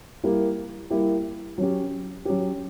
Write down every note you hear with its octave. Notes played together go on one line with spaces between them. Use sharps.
G3 A#3 E4 G4
G3 A#3 E4 G4
F#3 C#4 G4
F#3 C#4 G4